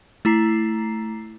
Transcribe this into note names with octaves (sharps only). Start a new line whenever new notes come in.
A3 E4 A#5 C7